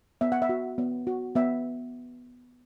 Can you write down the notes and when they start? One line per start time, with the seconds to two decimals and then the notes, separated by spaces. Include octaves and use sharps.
0.21 B3 E5
0.32 F#5
0.42 E5
0.49 F#4
0.78 B3
1.07 F#4
1.35 B3 E5